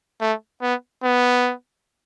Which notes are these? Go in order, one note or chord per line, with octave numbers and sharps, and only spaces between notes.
A3
B3
B3